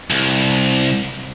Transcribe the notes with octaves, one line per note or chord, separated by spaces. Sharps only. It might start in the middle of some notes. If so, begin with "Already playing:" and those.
C2